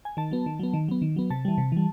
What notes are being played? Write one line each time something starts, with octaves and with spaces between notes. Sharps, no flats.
G#5
D#3 A5
F#3 B3
D#3
F#3 B3
D#3
F#3 B3
D#3
F#3 B3
C3 A5
E3 G3
C3
E3 G3